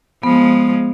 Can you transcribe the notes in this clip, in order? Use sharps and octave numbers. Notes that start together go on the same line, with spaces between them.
F3 G#3 B3